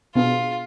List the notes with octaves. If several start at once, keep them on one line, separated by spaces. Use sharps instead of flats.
B2 B3 D4 F4 G#4